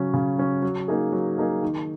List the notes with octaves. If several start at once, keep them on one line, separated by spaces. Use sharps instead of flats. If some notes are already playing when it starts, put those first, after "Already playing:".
Already playing: C#3 F#3 C#4
C#3
F#3 C#4
F#3
A#3 D#4 G#4
F#3
A#3 D#4 G#4
D#3